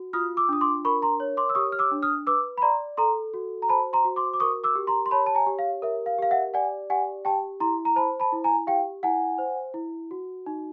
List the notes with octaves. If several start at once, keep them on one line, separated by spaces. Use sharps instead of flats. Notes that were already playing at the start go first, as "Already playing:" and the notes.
Already playing: F#4
F4 D#6 F6
D6 E6
D4 D#6
C6 D6
A#4 B5 C#6
A#5 C6
C#5
C6 D6
E6
G4 C#6 D#6
F6
D6 E6
D4
D#6 F6
B4 D6 E6
B5
D5 A#5 C6
A4 A#5 C6
F#4
A#5
C5 A5 B5
A#5 C6
F#4
C6 D6
D6
A#4 C#6 D#6
D6 E6
G4
A#5 C6
C6
C#5 A5 B5
A5
G#5 A#5
G4
F5
A#4 E5
F5
G4 F5
E5 F#5
D5 F#5 G#5
G4 F#5 G#5
G4 G5 A5
E4 A#5 C6
A#5
C5 A5 B5
A5 B5
E4
G#5 A#5
G4 F5 G5
E4 F#5 G#5
C5
E4
F#4
D#4